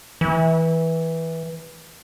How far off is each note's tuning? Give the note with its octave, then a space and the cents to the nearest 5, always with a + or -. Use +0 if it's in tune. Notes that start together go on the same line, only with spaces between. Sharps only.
E3 -15